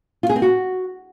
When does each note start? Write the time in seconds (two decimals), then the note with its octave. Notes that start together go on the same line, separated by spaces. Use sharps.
0.23 F4
0.29 G#4
0.36 C4
0.42 F#4